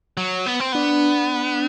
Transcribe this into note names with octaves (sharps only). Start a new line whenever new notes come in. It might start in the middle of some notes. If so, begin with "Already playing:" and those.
F#3
B3
C4
B3 D4